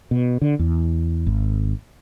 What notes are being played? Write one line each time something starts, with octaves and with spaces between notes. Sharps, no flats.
B2
D3
E2
G#1